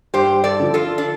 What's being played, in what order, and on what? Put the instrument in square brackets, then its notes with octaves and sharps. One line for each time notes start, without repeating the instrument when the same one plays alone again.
[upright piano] G2 [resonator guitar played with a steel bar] G4 C5
[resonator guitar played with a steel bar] A4 D5
[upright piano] D3 F3
[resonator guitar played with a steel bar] F4 A4
D4